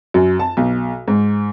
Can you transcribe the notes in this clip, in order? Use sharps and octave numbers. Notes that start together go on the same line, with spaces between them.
F#2
A5
B1
G#2